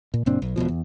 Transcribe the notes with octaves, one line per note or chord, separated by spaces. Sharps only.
A#2
F#1 A#2 C4 D4
B1
E1 D2 B2 F3
E2